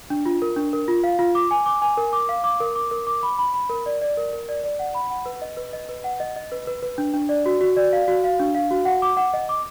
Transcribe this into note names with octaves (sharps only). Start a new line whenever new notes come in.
D4
F4
A#4
D4
A#4
F4
F5
F4
D6
G#5
D6
G#5
A#4
D6
F5
D6
A#4
D6
A#4
D6
B5
B5
B5
A#4
D5
D5
A#4
A#4
D5
D5
F#5
B5
F#5
B4
D#5
B4
D#5
B4
F#5
D#5
D#5
B4
B4
B4
D4
D4
D5
F#4
F#4
D5
F5
F#4
F5
D4
F5
F#4
F#5
D6
F#5
D#5
D6